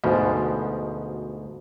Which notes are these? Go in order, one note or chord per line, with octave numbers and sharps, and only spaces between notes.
D2 G#2 B2 F3